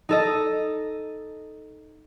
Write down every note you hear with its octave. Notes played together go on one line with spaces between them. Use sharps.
D#4 A4 D#5